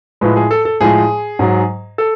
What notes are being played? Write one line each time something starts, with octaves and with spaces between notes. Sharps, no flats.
A2 F3 G#3 B4
G#4
A4
A4
A2 F3 G#3 G#4
G#2 F#3
A4